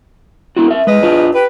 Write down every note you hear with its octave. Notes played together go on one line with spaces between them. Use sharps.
B3 E4 F#4
A#4 E5
E2 G#3 B4 D#5
D4 F4
G4 B4